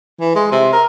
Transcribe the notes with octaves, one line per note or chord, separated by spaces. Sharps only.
E3
G#3
C3
A#4